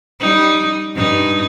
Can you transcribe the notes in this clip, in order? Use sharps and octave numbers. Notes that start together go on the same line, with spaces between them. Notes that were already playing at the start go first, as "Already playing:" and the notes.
G3 D#4
G2 D#4